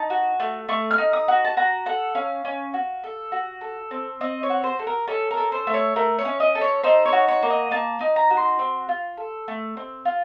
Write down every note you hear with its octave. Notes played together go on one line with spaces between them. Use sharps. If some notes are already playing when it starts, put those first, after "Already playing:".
Already playing: D#4 A5
F#4
A3
A3 C#6
F6
D#4
D#6
F#4
A5
F#4 A#5
A4 F#5
C#4 F5
C#4
F#4
A4
F#4
A4
C4
C4 D#5
C#5
F#4
C5
A4
A#4
C#4 A4
A#4
A4
C5
A3
C#5
A3 A#4
C#5
C#4
D#5
A4
C#5
D#4 C5
C#5
F#4
C#5
A#3
D#5
A#3 A5
D#4
A#5
F#4
C6
C4
F4
A4
A3
C4
F4